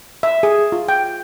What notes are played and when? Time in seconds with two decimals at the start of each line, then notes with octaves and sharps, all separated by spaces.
0.23 E5
0.43 G#4
0.72 F4
0.89 G5